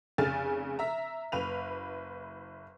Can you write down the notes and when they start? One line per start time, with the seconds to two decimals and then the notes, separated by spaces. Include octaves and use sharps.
0.18 F1 C#3 G#5 F6 A6
0.79 E5 A#5
1.32 F#1 B4 F7